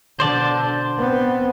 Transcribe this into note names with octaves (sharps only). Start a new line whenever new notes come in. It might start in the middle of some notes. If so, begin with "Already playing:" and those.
B2 D3 C5 D5 A5
B3 C4